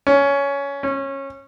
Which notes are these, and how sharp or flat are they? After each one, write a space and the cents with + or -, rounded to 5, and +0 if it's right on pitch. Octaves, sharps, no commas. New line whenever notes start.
C#4 +15
C#4 -20